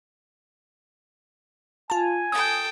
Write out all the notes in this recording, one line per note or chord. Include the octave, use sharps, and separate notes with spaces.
F4 G#5 A5
A4 G5 D#6